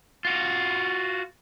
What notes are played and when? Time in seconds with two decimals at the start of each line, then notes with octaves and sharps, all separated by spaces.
0.25 F4 F#4